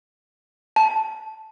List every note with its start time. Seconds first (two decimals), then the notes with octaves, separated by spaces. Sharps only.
0.76 A5